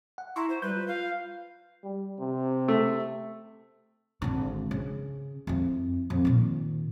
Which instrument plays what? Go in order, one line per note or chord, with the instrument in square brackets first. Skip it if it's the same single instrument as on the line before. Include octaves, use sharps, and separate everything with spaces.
[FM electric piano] F#5
[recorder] E4 [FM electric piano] A#5 C6 C#6
[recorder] C5
[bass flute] G3 [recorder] B4 [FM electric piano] G6
[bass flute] F4
[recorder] F5
[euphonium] G3
C3
[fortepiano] A3
[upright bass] G#1 D3
C#3
F2 E4
F2
A#2 D#3